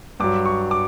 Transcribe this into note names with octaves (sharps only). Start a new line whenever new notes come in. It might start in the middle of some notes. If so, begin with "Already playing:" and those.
G2 F#3 D6
C#6
D6